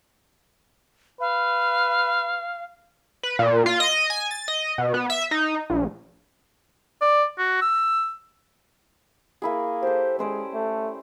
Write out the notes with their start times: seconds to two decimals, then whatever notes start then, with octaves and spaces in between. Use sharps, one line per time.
1.20 B4 F5
3.23 B4
3.39 A#2
3.66 F4
3.80 D#5
4.10 G#5
4.31 A6
4.48 D#5
4.78 B2
4.94 B3
5.10 E5
5.31 D#4
5.70 A#1
7.02 D5
7.38 F#4
7.62 E6
9.42 A#3 E4 G#4
9.83 G4 A4 C5
10.19 G#3 C#4 C5 D5
10.54 A3